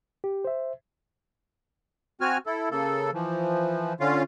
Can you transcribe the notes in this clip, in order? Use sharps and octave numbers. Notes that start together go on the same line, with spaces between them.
G4
C5 E5
C4 F#4 G#5 F6
E4 A4
C#3 A#3 A4
E3 F3
D3 C#4 F4 F5